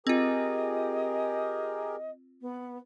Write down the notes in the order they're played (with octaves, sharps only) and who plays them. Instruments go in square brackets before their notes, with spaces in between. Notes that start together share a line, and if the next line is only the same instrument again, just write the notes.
[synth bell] C4 F4 [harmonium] G4 G#4 A#4 [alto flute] D#5
[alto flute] B3